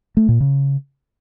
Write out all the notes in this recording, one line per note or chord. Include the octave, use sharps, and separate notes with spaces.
A3
A#2
C#3